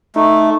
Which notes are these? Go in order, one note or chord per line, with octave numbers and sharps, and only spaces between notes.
A3 D#4